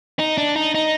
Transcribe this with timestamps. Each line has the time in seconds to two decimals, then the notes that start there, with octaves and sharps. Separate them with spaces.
0.19 D#4
0.38 D4
0.56 D#4
0.75 D#4